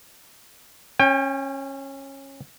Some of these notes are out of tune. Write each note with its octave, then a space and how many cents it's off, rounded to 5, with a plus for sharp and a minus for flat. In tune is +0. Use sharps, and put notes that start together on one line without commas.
C#4 -20 G5 +30